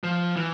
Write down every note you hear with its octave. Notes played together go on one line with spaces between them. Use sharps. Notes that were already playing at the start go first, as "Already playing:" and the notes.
F3
E3